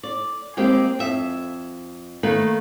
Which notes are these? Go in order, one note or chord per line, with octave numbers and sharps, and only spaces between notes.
D5
G#3 A#3 C4 G4
F2 E5
D#3 A3 A#3 B4